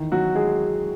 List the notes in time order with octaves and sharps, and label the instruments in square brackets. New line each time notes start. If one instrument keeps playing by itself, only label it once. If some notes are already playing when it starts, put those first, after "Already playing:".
Already playing: [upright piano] E2 D#3
F#3 F#4
G#3 G#4